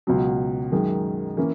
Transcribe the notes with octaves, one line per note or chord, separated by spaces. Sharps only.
C#2 B2 F#3
F#2 D#3 G#3
E3 A#3 C#4